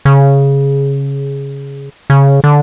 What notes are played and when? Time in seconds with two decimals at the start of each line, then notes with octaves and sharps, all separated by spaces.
0.05 C#3
2.10 C#3
2.44 D3